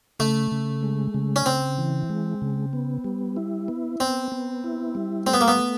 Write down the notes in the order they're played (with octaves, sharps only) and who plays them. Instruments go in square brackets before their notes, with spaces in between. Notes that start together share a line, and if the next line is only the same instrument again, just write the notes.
[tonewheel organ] C#3 [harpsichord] A3
[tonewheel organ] C#3
G#3
C#3
[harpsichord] C#4
[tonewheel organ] C#3 [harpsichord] C4
[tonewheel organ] E3
G#3
C#3
B3
G3
E4
B3
[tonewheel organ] B3 [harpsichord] C4
[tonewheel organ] B3
E4
G3
[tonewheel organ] A3 [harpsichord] C4
[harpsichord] B3
A#3
B3